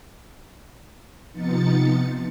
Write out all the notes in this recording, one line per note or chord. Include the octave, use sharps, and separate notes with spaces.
C3 F3 B3 D#4 A6 C#7